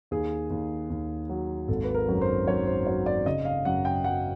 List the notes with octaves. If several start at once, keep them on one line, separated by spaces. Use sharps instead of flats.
D#2 G#4
D#2
D#2
F#3
G#1 A4
B4
A#4
F#2
C5
F#2 C#5
C5
F#3 C#5
D5
C#3 D#5
F5
F#2 F#5
G5
F#3 F#5